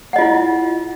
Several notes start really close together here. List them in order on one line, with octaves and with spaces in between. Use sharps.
F#5 D#5 F4 E4